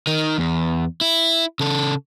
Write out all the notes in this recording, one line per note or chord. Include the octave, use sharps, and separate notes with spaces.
D#3 D#4
E2
E4
C#3 A4